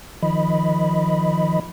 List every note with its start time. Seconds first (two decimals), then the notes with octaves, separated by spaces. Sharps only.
0.23 D#3 F3 D#5 B5